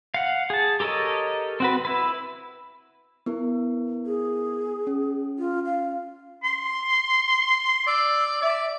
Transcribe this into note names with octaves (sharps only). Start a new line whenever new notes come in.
F5 F#5
G#4 A5
G4 A4 A#4 C#5 D#5
C4 F#4 B4
E4 B4
B3 E4 A#4
G#4
C#4
F4
F5
C6
D5 E6
D5 E5